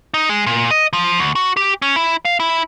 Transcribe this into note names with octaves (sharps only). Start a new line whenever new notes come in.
D#4
G#3
A#2
D#5
F3
D2
F#4
G4
C#4
E4
F5
E4